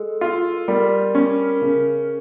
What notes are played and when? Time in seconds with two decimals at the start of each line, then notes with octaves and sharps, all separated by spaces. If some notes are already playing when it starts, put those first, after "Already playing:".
Already playing: G#3 A4
0.21 F4
0.57 A4
0.68 G3 A#4
1.15 C#4
1.62 C#3